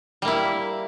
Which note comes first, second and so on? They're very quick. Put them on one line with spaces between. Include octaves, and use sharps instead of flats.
G3 A#3 E4